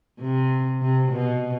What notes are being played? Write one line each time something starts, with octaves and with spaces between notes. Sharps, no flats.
C3
C3
B2